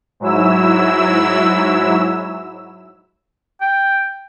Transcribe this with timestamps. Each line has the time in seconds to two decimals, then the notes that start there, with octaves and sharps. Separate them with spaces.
0.20 G#2 F#3 E4 E6
3.61 G5